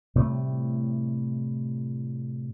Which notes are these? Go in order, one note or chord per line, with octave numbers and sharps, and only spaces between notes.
A2 C3 G3 A3